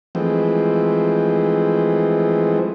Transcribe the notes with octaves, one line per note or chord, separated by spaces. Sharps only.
E3 F3 G#3 A3 C4